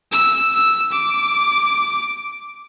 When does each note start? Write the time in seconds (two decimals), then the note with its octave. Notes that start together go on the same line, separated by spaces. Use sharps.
0.12 E6
0.53 E6
0.92 D6